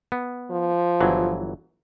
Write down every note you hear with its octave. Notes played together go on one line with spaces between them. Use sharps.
B3
F3
G1 E3 F#3